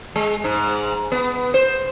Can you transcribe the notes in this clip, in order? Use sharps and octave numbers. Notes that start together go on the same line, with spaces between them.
G#3
G#2
B3
C5